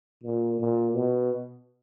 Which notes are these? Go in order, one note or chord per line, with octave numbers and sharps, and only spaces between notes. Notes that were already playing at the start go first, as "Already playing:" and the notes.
A#2
A#2
B2